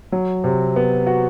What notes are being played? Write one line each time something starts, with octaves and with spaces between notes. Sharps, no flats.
F#3
C3
B3
F#4